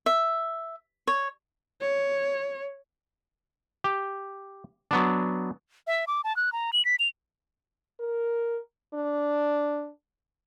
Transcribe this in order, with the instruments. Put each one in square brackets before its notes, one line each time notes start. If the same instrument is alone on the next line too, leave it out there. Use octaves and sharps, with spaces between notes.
[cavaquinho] E5
C#5
[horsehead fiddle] C#5
[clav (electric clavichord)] G4
F#3 B3 D4
[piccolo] E5
D6
A5
F#6
A#5
F#7
B6
F7
[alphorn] A#4
D4